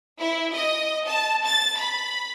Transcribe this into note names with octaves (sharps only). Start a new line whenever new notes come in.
E4
D#5
A5
A6
B5